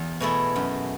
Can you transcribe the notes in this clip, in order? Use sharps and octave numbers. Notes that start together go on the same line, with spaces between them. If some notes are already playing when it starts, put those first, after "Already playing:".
Already playing: E2
B2 A3 E4 G#4
F#2